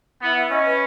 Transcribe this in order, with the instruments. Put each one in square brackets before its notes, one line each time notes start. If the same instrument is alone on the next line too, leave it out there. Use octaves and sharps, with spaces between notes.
[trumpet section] B3 [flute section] E4
[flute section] E4
[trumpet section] C#4 [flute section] D#5
[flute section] B4